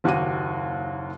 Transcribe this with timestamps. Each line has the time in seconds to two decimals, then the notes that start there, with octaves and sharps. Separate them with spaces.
0.04 F#1 D#2 F#4 G4 D#7